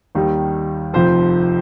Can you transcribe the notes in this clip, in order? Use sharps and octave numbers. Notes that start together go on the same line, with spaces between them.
D#2 D#3 G3
F1 F2 F3 C5